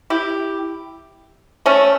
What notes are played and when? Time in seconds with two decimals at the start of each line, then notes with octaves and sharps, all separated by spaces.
0.10 E4 G4
1.66 A3 C#4